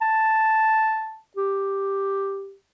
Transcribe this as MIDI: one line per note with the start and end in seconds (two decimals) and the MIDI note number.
0.02 1.19 81
1.37 2.54 67